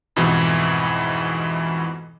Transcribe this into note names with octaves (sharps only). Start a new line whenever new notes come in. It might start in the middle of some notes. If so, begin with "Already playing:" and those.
F2 G#2 B2 E3